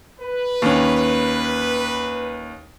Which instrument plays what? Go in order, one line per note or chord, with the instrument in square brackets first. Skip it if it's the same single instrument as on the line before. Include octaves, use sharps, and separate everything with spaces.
[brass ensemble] B4
[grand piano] D#2 C#4